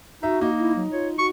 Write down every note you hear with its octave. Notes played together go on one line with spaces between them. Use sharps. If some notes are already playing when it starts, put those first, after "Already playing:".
D#4 F#4 E5
A#3 D#4
E4
F#3
F4 C#5
F#4 C#6